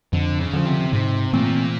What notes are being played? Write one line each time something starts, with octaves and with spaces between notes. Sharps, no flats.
F2 D3
C#3
D3 F3
C3
G#2 C3
A#2 E3 A3 C4